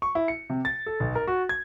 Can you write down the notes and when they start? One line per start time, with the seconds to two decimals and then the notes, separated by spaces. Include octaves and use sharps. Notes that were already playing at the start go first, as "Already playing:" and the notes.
0.02 C#6
0.15 E4
0.28 C#7
0.50 C3
0.65 A6
0.86 A4
1.00 B1
1.15 A#4
1.28 F#4
1.49 G#6